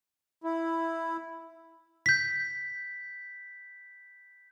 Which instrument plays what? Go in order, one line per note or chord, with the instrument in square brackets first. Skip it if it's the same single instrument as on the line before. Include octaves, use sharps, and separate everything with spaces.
[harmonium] E4
[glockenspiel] G6 B6